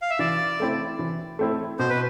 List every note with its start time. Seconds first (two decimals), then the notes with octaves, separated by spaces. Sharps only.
0.02 F5
0.10 E5
0.19 E3 D5
0.60 A3 C4 E4
0.99 E3
1.39 A3 C4 E4
1.79 B2 C5
1.90 B4